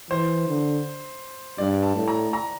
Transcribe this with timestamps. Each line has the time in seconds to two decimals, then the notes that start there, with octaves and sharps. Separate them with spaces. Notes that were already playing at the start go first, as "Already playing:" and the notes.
0.10 E3 C5
0.48 D3
1.58 G2 D5
1.83 A5
1.96 A2
2.08 A#5
2.33 A#5